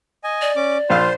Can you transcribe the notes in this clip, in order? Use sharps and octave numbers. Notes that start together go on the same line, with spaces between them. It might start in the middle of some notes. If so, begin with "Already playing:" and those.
D#5 G#5
D5
C#4 D6
A#1 F4 C5 F5